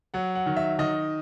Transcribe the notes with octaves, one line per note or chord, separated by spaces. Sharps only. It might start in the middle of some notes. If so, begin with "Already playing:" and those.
F#3 F#5
F#5
D#3
E5
D#3 D#5